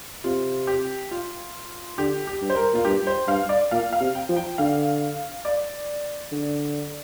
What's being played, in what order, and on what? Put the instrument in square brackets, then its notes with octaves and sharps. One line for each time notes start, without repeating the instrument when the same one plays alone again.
[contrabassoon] C3 [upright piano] F4
[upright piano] G4
F4
[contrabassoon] D3 [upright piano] G4
[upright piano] G4
[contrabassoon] G2
[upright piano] C5
A#4
[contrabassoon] A#2 [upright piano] F4
[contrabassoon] G2 [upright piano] G4
[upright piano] C5
[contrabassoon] G2 [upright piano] F5
[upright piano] D5
[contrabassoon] A#2 [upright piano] F5
[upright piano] F5
[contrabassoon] C3
[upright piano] G5
[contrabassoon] F3
[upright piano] G5
[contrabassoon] D3 [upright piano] F5
[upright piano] D5
[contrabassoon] D3